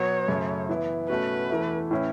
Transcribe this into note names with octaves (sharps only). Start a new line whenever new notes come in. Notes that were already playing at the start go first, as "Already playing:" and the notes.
Already playing: B2 F#3 B3 C#5
F#2 C#3 A3
E3 B3 E4
B2 A3 C#4 F#4 B4
E2 E3 A3 E4
A2 E3 C#4 E4